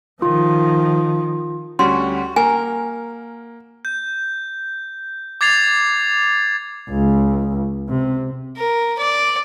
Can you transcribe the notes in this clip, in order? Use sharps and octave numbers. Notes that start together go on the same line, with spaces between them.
D#3 F3 F4
D2 G3 C#4 F#4 C6
A#3 A#4 G#5
G6
D6 G#6 A6 C7 F7
C#2
C3
A#4
D5